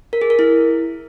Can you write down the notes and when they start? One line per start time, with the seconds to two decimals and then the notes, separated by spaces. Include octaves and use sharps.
0.13 A#4
0.21 G#4
0.30 A#4
0.39 E4